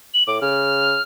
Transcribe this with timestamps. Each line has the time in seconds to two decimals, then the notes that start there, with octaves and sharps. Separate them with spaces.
0.14 F#7
0.27 A2 D6
0.41 C#3 F6